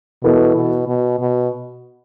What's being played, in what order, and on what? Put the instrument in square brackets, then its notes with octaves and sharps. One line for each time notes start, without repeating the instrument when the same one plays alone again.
[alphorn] B2 [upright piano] E3 B3 E4 A4
[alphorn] B2
B2
B2